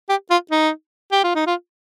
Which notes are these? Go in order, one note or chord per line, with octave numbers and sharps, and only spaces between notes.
G4
F4
D#4
G4
F4
D#4
F4